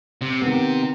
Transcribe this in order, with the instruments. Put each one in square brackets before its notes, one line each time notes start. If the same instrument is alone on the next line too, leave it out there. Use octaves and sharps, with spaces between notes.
[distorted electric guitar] C3
[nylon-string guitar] D#3 B3